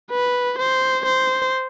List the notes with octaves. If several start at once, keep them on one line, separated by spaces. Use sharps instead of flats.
B4
C5
C5